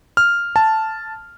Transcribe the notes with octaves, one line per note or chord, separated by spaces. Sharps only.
F6
A5